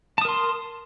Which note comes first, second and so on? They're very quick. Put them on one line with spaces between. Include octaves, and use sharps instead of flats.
A5 D#6 A#4 C6